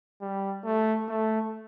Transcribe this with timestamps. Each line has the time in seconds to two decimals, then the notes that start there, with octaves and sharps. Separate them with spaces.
0.21 G3
0.65 A3
1.09 A3